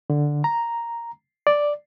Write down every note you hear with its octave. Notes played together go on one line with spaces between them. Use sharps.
D3
A#5
D5